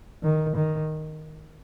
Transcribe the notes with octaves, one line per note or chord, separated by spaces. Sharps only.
D#3
D#3